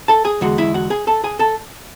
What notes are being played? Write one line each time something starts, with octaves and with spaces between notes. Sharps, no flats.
A4 A5
G#4 G#5
E2 D3 G#3 F#4 F#5
E4 E5
F#4 F#5
G#4 G#5
A4 A5
G#4 G#5
A4 A5